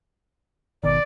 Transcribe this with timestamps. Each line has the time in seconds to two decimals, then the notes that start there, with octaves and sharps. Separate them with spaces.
0.83 G#1 B2 D#3 D5